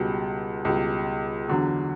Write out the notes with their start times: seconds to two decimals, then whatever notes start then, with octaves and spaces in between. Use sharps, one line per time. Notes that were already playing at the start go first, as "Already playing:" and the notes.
Already playing: C#2 B2 G3
0.65 C#2 B2 G3
1.48 E2 D3 F#3